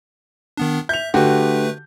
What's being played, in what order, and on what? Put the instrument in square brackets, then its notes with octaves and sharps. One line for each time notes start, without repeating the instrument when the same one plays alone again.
[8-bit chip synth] D#3 B3 D4
[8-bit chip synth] E5 [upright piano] G6 F7
[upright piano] D3 F#4 G4 [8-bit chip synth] A3 B4